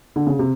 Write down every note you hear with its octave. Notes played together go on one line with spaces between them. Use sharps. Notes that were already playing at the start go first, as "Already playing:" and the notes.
D3
C#3
C3